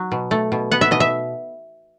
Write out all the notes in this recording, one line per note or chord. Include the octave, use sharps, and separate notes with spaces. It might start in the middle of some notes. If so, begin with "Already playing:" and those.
Already playing: F#3
B2
A3
B2
B3 F#5
E5
B2 D#5
E5